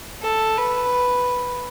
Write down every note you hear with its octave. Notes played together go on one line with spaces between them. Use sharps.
A4
B4